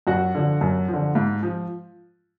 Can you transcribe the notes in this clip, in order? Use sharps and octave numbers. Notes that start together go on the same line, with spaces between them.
F#2 F#4 F#5
D3 F3
F#2
F3
D3
G#2
F3